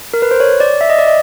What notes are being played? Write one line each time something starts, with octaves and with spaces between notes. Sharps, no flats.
A#4
B4
C5
C#5
D5
E5
D#5
D5
D#5